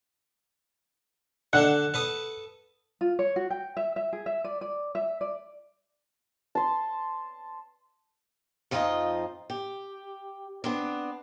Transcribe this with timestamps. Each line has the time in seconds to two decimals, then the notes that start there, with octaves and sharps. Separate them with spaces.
1.53 D3 D4 A4 F#5
1.94 A4 B4 D#6
3.01 F4
3.19 C#5
3.36 F#4
3.50 G5
3.77 E5
3.96 E5
4.13 G#4
4.26 E5
4.44 D5
4.61 D5
4.95 E5
5.21 D5
6.55 A5 C6
8.71 F2 F3 G#3 D#4 F4 D#5
9.50 G4
10.64 B3 C4 D4